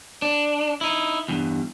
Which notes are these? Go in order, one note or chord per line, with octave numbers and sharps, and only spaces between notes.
D4
D#4 E4
E2 G2